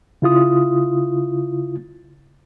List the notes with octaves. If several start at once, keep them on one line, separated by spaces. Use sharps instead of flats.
C#3 E4 F4 D#6